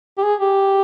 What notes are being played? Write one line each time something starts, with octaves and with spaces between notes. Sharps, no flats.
G4
G#4
G4